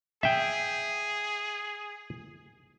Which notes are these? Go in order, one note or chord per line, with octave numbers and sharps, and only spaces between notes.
G#4 E5 G5